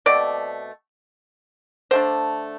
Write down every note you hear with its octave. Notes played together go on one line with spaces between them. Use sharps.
B2 A3 C4 D5
D3 A3 D4 C5